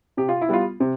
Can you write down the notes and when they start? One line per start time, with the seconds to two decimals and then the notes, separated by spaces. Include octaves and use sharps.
0.17 C3 G4
0.29 F4
0.41 E4
0.49 G3 B3 F4
0.80 C3